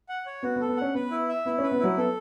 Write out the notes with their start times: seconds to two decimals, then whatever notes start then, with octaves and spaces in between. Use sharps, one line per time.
0.09 F#5
0.26 C#5
0.43 B3 F#4
0.56 B3
0.61 A4
0.68 B3
0.77 C#4 F#5
0.95 B3 B4
1.11 E4
1.29 E5
1.45 B3 E4
1.58 C#4
1.63 B4
1.72 B3
1.80 F#3 E4
1.97 B3 A4